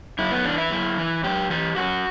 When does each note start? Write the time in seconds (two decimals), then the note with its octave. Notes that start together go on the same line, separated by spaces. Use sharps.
0.19 F#2 E4
0.31 B3
0.44 E3 D4
0.58 E4
0.71 F#2
0.98 E3
1.23 F#2 G4
1.50 E3 G4
1.76 F#2 F#4